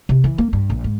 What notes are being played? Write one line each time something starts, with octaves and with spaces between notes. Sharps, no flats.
C3
E3
A#3
G2
A#1
G#2